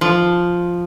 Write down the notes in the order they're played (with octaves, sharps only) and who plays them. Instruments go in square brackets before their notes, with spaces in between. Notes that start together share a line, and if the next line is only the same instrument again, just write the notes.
[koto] F3